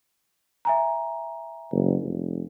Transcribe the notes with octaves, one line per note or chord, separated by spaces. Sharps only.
E5 G#5 A#5
F#1
F1